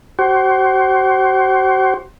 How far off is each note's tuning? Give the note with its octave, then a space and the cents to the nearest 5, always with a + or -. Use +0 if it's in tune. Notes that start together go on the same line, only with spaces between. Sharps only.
F#4 +40 C5 +15